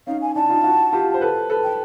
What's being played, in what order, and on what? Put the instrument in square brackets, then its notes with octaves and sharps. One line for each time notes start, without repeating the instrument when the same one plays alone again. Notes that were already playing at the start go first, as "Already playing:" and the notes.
[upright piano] C#4 D#4 [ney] F5
[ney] G#5
[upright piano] D4 E4 [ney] A5
[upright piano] D#4 F4
E4 F#4
F4 G4
C5
A4 B4
A4 B4
[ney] G5